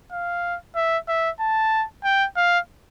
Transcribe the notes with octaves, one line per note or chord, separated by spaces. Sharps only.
F5
E5
E5
A5
G5
F5